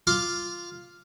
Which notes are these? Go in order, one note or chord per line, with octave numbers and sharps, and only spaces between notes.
F4 F5 C6 D6